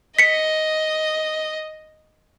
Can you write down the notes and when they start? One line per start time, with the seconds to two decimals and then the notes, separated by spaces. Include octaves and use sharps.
0.19 D#5 B6 C#7